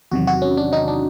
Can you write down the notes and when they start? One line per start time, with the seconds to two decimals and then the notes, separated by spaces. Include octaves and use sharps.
0.11 E2 C3 D#3 F#3 F#4
0.27 F#4
0.42 C#4
0.57 D4
0.73 D#4
0.88 D4